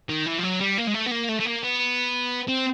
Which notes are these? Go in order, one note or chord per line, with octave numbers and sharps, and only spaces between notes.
D#3
E3
F3
F#3
G3
A#3
G#3
A3
B3
A#3
A3
A3
A#3
B3
C4